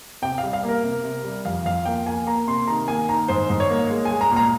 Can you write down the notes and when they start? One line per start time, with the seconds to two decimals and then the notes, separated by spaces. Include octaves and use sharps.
0.22 C3 G5
0.38 F5
0.43 G3
0.53 F5
0.63 A#3
0.68 A#4
0.83 C3
1.04 C3
1.24 G3
1.45 F2 F5
1.65 F2 F5
1.85 A#3 G5
2.06 A#3 G#5
2.27 A#3 A#5
2.47 C3 C6
2.68 D#3 A#5
2.88 A#3 G#5
3.09 D#3 A#5
3.28 G#2 C5
3.50 G#2
3.60 C#5
3.70 A#3
3.90 G#3
4.05 G#5
4.11 G#3
4.21 A#5
4.32 A#2 A#5